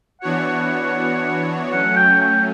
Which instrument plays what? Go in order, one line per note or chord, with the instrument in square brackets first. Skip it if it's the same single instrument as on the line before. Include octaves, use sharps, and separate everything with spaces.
[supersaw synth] E3 B3 D4 F#4 C#5 [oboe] F#5
[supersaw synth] F#3 A3 C#4 [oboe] F#5
[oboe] G5
G5